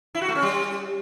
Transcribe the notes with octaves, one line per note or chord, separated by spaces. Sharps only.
E4
F#4
A3
C#4
G3